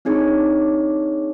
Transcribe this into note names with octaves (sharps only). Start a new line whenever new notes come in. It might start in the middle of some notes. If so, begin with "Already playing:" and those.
C4 D4 D#4 G#4 C#5